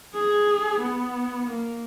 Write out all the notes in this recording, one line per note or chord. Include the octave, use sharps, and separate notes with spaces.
G#4
B3
A#3